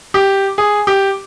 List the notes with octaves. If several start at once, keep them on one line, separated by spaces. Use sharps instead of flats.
G4
G#4
G4